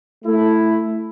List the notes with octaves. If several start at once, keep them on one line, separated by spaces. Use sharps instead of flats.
A3 E4